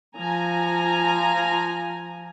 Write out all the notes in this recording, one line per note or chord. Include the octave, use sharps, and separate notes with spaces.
F3 G#5 A#5